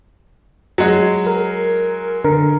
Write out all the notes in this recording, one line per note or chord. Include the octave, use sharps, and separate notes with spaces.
F#3 G#3
A#4
D3 A#4